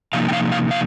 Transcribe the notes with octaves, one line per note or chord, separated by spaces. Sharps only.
C3 F3 A#3 D#4 F5
G5
F5
F5
F5